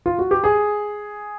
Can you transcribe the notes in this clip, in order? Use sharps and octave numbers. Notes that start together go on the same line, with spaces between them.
F4
F#4
G4
G#4